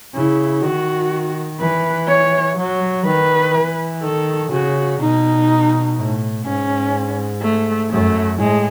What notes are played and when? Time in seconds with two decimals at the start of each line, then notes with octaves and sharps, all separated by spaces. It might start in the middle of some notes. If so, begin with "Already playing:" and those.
0.14 C#3 E4
0.63 D#3 F#4
1.60 E3 B4
2.08 C#5
2.57 F#3
3.05 D#3 B4
3.54 E3
4.03 D#3 A4
4.51 C#3 F#4
5.00 B2 D#4
5.97 A2
6.45 G#2 C#4
7.42 A3
7.91 F#2 A3
8.39 A2 G#3